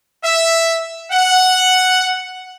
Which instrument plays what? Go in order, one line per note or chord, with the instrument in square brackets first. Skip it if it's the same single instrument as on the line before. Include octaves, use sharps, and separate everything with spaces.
[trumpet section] E5
F#5